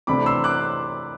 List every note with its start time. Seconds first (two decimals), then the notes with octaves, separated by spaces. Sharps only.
0.07 C3 E3 A3 D4 B5 D6
0.26 C6 E6
0.44 D6 F#6